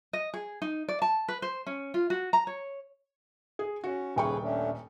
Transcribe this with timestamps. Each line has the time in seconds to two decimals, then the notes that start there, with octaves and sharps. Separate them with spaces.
0.13 D#5
0.34 G#4
0.62 D#4
0.89 D5
1.02 A5
1.28 B4
1.42 C5
1.67 C#4
1.94 F4
2.10 F#4
2.33 A#5
2.47 C#5
3.59 G#4
3.84 C#4 F#4
4.16 D#1 C#3 G#4 B4 G5 C#6
4.41 A3 C#4 D4